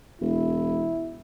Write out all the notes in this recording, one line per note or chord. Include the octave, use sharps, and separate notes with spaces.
E1 E4